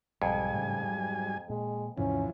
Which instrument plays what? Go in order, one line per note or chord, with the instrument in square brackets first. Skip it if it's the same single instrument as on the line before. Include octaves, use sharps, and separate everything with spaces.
[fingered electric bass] B1 [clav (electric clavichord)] F2 [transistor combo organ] G#2 G3 G#5
[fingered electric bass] A2 C#3
F#3
[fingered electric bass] A#2 [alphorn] G#3
[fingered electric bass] D#2 G#2 C3 [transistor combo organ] E3 F3 [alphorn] C#4